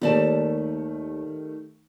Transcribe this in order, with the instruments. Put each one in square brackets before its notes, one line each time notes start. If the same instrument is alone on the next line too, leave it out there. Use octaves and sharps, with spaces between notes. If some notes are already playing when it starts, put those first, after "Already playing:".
[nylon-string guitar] D#2 D5 A5 [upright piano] D#3 G3 A3